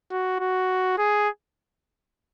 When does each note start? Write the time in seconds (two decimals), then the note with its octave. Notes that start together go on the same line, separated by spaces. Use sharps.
0.11 F#4
0.40 F#4
0.98 G#4